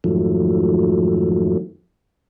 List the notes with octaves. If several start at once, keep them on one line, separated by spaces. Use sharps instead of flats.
F2 G#2 D#3 F3 F#3 A3